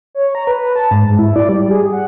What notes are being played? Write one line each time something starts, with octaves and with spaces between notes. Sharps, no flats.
C#5
A#5
B4
A5
G#2
G#2
E4
D5
G3
G#4
F#5